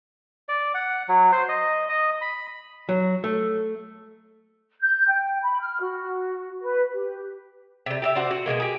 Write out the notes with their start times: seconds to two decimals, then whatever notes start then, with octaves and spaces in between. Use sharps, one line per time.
0.49 D5
0.74 F#5
1.09 F#3
1.32 C5
1.49 D#5
1.89 D#5
2.21 B5
2.89 F#3
3.24 A3
4.82 G6
5.08 G5
5.42 B5
5.60 F6
5.81 F#4
6.62 B4
6.93 G4
7.86 C3 G3
8.02 G4 A4 E5
8.15 F#4 C5 D5
8.31 F#4
8.46 B2 D3 G#3 A#3
8.60 G4 G#4